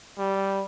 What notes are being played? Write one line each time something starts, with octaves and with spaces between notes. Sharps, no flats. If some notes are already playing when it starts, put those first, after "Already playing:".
G3